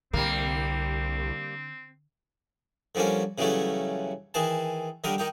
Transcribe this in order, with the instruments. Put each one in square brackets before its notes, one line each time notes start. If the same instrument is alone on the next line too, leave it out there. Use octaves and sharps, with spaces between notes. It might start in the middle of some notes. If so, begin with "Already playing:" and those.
[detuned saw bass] C2 [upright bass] D3 [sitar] G3 A#3 [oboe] C4
[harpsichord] D3 F3 G3 A#3 C#4
C#3 E3 F#3 G3 A3 C#4
D#3 E3 G#4 A5
D3 D#3 G3 A#4 D#6
D#3 D#4 G4